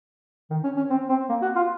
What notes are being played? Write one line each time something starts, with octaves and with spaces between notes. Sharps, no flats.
D#3
C#4
C#4
C4
C4
A#3
F#4
F4